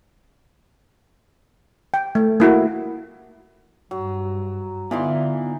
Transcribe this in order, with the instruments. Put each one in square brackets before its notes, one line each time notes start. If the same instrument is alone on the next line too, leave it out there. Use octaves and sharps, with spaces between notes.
[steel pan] G5
A3
A#3 E4 F#4
[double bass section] G2 [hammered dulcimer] F#3
[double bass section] D3 [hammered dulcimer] E3 D#4 C6 [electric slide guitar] B3 F4 D5